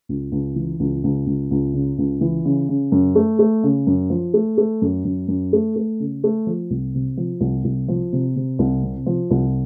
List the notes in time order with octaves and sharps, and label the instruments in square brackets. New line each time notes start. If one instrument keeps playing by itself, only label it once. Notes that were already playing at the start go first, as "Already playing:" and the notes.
[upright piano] C#2
C#2
E3
C#2
C#2
C#2
C#2
C#3
C#2
E3
C#3
C#3
F#2
A3
A3
C#3
F#2
F3
A3
A3
F#2
F#2
F#2
A3
A3
C#3
A3
F3
C2
C3
F3
C2
C2
F3
C3
C3
C2
C3
F3
C2